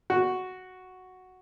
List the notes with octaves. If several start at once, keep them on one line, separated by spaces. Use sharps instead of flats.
F#4